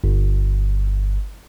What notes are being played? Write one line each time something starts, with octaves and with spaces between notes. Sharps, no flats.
G1